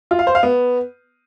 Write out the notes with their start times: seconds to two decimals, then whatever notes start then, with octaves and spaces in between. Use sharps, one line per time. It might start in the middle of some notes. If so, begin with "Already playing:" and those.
0.11 F4
0.19 F5
0.27 C5
0.35 F5
0.43 B3